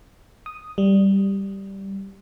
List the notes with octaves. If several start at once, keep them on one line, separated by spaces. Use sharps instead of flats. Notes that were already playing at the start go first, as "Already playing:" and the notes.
D#6
G3